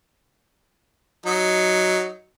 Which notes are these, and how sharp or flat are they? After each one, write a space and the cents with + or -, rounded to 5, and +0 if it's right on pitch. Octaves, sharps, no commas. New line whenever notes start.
F#3 +0 D#4 +0